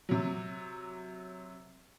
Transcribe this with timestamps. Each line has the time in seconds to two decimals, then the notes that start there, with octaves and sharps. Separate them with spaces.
0.09 C3 F#3